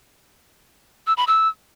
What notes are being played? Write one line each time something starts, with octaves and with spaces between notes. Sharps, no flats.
E6
B5
E6